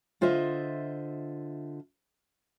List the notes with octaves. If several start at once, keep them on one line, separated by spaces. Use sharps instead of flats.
D3 F4 C5 D#5 E5